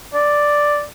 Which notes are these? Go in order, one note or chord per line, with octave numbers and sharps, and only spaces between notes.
D5